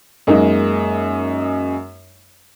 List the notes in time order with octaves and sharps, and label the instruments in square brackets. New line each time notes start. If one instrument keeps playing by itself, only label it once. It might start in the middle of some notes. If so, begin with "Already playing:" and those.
[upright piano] F#2 G#3 A#3 D#4